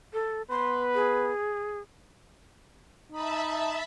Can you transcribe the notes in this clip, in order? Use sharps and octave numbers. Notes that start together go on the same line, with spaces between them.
A4
B3 B4 C6
G#4
D#4 E5 A5 B5